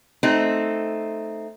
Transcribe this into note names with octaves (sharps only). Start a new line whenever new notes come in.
A3 C4 D#4